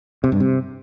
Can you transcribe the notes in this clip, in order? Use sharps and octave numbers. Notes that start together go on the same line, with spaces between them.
C3
G2
C3